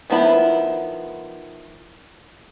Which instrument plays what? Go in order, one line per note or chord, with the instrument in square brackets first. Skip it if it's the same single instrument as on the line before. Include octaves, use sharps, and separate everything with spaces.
[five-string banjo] D#3 F3 B3 E4 B5